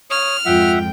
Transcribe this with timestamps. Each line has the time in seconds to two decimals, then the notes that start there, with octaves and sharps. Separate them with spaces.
0.11 C#5 D#6 F6
0.46 F2 G#2 F4 E5 F#5 G5